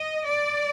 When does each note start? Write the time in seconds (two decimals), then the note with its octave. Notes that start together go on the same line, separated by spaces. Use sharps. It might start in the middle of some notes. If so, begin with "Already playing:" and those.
Already playing: D#5
0.28 D5